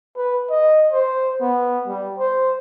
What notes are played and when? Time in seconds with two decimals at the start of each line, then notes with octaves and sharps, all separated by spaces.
0.17 B4
0.50 D#5
0.92 C5
1.41 B3
1.87 G3
2.18 C5